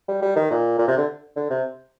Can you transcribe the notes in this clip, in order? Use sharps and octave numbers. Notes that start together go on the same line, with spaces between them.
G3
G3
D#3
A#2
A#2
C3
D3
D3
C3